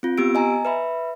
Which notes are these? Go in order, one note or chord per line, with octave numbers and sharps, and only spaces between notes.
C4 F4
B3 G4 E6 D7
D#5 G#5 A#5
B4 E5 B5